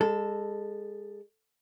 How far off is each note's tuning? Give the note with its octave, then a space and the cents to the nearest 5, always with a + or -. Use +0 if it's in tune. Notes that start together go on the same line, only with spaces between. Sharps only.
G#3 -25 A4 +0